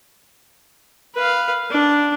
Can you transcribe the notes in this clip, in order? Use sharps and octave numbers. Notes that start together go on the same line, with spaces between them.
B4 F5
D4